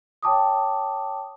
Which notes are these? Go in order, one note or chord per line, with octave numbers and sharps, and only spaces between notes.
C#5 G5 A5 D6 D#6